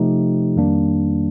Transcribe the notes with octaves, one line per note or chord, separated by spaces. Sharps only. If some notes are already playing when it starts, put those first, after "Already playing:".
Already playing: C3 F3 A3 D#4 G4
F2 D#3 G3 A#3 D4